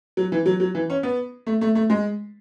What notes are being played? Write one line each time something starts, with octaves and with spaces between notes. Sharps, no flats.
F#3
E3
F#3
F#3
E3
C#4
B3
A3
A3
A3
G#3